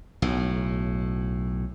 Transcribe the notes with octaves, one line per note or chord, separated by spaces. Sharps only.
B1 A2